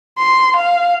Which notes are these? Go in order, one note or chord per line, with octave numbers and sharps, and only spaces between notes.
C6
F5